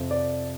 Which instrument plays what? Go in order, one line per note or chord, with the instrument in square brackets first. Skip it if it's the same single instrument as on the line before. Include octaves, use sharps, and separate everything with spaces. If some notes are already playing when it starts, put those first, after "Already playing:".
Already playing: [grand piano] F2 C3 F3
D5